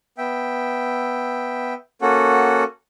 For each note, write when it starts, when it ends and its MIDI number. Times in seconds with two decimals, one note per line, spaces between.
0.18 1.74 59
0.18 1.74 76
0.18 1.74 79
2.02 2.64 58
2.02 2.64 61
2.02 2.64 66
2.02 2.64 69
2.02 2.64 78